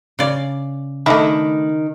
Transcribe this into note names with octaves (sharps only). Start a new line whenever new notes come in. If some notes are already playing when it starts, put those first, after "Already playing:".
C#3 D5
D#3 A3 D4 E4